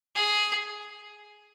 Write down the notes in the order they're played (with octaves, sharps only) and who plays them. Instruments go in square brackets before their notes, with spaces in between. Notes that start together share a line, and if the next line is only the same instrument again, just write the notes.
[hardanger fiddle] G#4